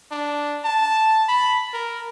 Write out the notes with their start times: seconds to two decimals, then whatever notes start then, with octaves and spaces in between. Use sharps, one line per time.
0.12 D4
0.65 A5
1.29 B5
1.73 A#4